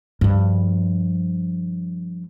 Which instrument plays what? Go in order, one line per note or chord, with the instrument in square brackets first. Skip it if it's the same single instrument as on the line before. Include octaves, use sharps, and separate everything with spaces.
[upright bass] G2 F3